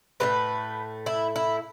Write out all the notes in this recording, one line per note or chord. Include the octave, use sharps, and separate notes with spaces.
A2 E3 A3 B4
E4
E4